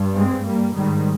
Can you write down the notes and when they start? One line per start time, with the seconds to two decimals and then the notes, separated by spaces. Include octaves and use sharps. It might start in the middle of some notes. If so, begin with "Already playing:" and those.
Already playing: G2
0.16 G#3 C4
0.45 G3 A#3
0.76 G#2 D#3 G3